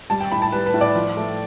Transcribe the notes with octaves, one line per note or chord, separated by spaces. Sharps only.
G3 A5
G5
A2 B5
A5
G3 B4
B4
A2
D5
F3
A3